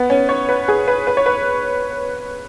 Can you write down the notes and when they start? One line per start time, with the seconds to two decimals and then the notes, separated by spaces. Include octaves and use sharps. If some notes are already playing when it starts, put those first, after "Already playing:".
Already playing: B3
0.10 C#4
0.29 C#5
0.49 B4
0.68 G#4
0.88 B4
1.07 B4
1.17 C#5
1.26 B4